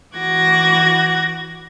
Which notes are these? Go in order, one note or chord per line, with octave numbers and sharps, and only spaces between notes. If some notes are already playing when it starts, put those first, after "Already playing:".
E3 F#4 D6 F#6 G#6 A#6